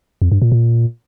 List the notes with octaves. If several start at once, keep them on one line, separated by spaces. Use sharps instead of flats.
F2
G2
A#2
A#2